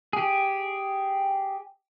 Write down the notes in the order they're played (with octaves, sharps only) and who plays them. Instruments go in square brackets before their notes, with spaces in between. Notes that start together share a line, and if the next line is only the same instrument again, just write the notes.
[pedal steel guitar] G4 G#4